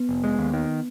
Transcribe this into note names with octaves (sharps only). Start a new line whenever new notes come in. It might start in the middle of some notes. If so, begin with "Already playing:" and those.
Already playing: B3
F1
G#3
D#2
D#3